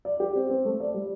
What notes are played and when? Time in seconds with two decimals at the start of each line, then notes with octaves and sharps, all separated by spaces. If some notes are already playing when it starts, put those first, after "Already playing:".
0.05 D5
0.20 G4
0.35 C4
0.50 C4
0.65 A3
0.80 D5
0.94 G3